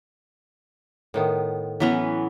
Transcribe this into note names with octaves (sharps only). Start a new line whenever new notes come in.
A2 D#3 B3
E3 F#3 B3 C#4 E4 F#5